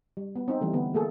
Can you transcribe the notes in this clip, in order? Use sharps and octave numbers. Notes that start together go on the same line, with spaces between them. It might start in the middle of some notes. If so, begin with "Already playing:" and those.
G3
B3
C4 D#4
E3 G3 A3
D3 B3
A3 A#3 G#4 A4